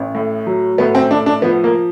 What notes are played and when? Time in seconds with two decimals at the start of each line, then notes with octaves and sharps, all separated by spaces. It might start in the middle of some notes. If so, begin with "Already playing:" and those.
Already playing: A1
0.15 A2
0.47 F#3
0.78 A2 B3
0.95 C4
1.11 A2 D4
1.26 D4
1.42 F3 B3
1.64 A#3